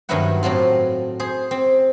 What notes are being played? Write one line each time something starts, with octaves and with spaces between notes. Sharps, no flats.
G2 D#3 F#3 B3 E4 F#5
A2 F#3 C4 F4
G#4 C5
C4